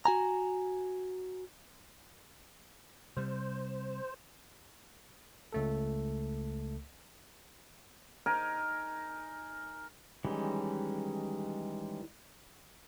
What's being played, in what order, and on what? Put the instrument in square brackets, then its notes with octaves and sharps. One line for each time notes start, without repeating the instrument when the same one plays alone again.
[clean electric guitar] F#4 G#5 A#5
[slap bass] C3 G3 [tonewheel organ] C5
[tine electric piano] C#2 A3 A4
[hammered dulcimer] D#4 A#4 G#5
[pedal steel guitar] D#3 E3 G3 G#3 C#4